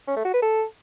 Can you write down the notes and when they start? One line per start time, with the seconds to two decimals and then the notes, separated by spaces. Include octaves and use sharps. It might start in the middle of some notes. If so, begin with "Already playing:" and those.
0.08 C#4
0.16 A3
0.25 F#4
0.34 B4
0.42 A4